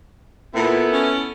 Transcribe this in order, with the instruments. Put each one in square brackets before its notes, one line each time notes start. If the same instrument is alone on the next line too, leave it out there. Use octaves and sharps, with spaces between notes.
[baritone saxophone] A#2 [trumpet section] B3 E4 A4
[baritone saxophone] C#4